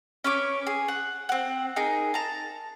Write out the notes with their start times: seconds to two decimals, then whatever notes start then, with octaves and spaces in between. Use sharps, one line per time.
0.24 C#4 B4 C#5 D6
0.67 G#4
0.88 F#5
1.29 C4 F#5
1.76 D#4 G#4 A#4
2.14 A5 A#5